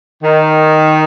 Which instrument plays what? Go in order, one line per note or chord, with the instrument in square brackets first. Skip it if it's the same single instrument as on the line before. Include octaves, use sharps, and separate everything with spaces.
[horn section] D#3